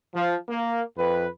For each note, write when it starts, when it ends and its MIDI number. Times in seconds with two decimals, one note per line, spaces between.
0.14 0.36 53
0.48 0.81 58
0.98 1.28 41
0.98 1.28 71